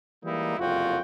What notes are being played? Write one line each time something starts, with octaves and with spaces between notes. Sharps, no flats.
E3 G3 G#3 A#3 D#4 E4
F#1 C2 F2 F4 F#4 G5